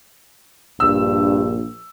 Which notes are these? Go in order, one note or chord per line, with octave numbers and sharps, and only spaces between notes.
A#1 G2 E6